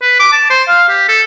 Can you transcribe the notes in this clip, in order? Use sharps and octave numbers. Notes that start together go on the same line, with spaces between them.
B4
D6
A5
C5
F5
G4
A4